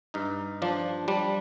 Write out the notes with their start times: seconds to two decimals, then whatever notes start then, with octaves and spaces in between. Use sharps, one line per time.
0.14 G2 D#4
0.62 F3 D4
1.08 G3 D4